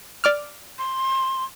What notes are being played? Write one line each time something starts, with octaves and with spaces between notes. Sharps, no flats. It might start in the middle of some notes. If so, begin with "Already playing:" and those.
D5 D6 F6
C6